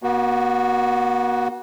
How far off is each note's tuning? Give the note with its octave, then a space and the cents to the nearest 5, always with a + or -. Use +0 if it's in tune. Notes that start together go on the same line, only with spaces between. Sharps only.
A#3 +45 F#4 +0